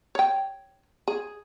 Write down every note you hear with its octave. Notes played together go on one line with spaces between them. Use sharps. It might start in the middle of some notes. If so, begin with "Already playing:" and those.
C#5 G5
G#4